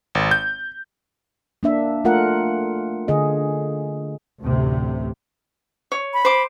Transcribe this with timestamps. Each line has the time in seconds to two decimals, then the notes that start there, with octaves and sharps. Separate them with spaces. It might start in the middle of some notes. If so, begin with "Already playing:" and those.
0.15 G#1
0.31 G6
1.63 A#3 D4 E5
2.05 A3 F4 A#4 F#5
3.08 D3 G#4 D#5
4.40 A1 D2 C3
5.92 C#5
6.14 B5
6.25 C5 D6